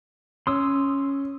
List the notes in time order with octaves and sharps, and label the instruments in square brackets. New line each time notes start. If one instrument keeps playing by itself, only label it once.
[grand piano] C#4 [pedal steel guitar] C6 D#6 E6